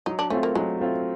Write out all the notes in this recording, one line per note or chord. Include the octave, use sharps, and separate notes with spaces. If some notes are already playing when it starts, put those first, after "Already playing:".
F#3 D#4
D4
A3 C4 C#4 F4
A#3
F#3 G#3
A3 C4 F4